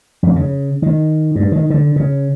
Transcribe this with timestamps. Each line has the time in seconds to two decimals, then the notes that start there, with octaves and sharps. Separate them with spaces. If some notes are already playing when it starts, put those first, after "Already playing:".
0.23 F2
0.36 C#3
0.82 D#3
1.35 G2
1.52 D#3
1.70 D3
1.96 C#3